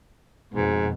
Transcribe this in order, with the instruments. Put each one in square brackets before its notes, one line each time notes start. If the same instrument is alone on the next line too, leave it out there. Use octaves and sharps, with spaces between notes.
[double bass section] F2 B2 B3 [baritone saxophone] G#2